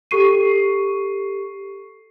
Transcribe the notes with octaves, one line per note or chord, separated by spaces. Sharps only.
G4 A4 C#6 C7 D#7